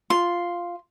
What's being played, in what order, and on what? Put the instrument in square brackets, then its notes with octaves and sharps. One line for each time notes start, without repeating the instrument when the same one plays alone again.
[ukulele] F4 [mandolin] C6